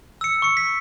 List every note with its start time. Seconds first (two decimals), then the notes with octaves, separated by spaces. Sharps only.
0.21 E6 C#7
0.42 C#6 C#7
0.57 B6